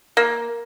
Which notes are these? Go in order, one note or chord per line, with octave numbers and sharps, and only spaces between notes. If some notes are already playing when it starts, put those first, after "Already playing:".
A#3